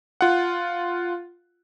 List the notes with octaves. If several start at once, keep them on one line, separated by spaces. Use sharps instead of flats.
F4 F#5